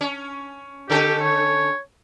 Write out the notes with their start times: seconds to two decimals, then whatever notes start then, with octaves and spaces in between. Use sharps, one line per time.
0.01 C#4
0.90 D3 C#4 G4 A4
1.21 C#5